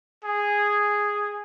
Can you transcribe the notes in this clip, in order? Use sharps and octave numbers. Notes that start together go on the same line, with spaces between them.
G#4